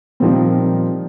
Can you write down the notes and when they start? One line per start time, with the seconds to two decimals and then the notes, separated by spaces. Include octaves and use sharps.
0.20 A#2 D#3 F3 G3 A#3 C4